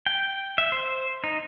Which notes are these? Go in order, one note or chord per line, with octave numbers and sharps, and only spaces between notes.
G5
E5
C5
D#4